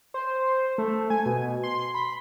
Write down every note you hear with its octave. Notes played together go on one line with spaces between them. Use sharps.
C5
A3
G#5
B2
C6
B5